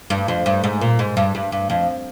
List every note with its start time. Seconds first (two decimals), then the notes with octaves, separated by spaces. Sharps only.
0.10 G2
0.28 F2
0.46 G2
0.64 G#2
0.81 A#2
0.99 G#2
1.17 G2
1.35 G2
1.52 G2
1.70 F2